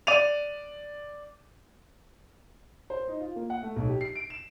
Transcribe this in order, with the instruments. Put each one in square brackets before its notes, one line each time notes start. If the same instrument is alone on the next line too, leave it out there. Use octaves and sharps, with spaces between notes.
[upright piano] D5 D#7 F7
[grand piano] C5
D#4
F4
A#3
F#5
A3
B1
G4
C7
D7
E7